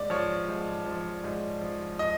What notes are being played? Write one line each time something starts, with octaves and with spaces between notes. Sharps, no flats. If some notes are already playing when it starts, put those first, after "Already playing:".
Already playing: G#2 D5
F3 C#5
G#2
F3
G#2
F3
D#5